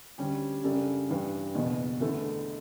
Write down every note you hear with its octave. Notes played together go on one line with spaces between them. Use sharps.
D2 D3 G3 C#4 G4
F#2 C#3 G3 D4 A4
G2 E3 G3 D4
F#1 E2 B2
E2 D3 A3 E4 A4